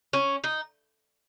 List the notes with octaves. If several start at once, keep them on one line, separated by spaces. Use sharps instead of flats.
C#4
D#4